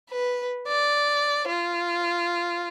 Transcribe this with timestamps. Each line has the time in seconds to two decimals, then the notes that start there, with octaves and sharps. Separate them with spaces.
0.11 B4
0.68 D5
1.48 F4